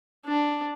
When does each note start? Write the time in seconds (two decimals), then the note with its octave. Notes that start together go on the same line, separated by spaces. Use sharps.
0.26 D4